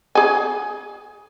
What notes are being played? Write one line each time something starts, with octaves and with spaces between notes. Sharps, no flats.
G#4 G#5